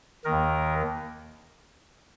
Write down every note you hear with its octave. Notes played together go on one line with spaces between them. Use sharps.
D#3 A#4
D#2